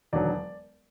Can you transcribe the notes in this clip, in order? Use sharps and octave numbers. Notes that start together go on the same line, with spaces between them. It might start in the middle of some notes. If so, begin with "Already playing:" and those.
E1 D#2 D3 F#3 D5